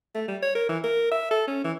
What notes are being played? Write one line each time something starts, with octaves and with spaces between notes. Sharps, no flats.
A3
G3
C#5
A#4
E3
A#4
E5
A4
C#4
E3